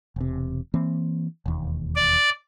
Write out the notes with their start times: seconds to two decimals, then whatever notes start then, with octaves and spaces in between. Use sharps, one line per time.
0.16 E1 C3
0.74 E3 A#3 C4
1.46 E1 D#2
1.96 D5